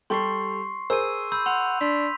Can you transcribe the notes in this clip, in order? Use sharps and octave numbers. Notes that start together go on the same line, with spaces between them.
G3 G4 A4 C6 C#6 C7
G#4 A#4 C5 E6 D#7
B5 E6 G6
F#5 C6 F7
D4 C6 B6